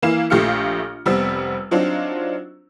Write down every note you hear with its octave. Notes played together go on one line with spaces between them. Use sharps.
E3 A#3 E4 F5 E7
A#1 A3 G4 F5 F6 C#7
F1 G3 B3 C4 E6
F#3 C4 D4 D#4 F4